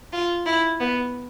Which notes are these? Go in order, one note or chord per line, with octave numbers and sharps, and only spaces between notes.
F4
E4
B3